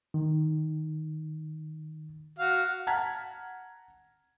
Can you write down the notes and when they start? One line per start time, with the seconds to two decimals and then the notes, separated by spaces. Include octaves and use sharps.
0.14 D#3
2.39 F#4 F5
2.87 F#5 A5 A#5 F6 G#6 B6